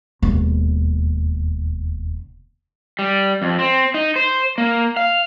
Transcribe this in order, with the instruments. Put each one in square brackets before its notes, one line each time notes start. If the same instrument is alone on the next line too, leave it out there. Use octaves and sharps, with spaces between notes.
[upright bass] E1 D#2
[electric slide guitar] G3
F2
C4
D#4
C5
A#3
F5